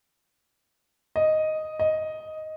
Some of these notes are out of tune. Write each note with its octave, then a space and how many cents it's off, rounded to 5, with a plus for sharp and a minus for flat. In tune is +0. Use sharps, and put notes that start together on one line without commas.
D#5 +0
D#5 +5